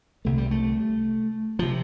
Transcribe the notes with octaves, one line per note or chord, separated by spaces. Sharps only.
C2 C3 A3
G3
A3
C3 F3